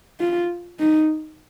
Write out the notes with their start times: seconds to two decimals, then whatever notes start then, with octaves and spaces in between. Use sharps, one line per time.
0.20 F4
0.79 D#4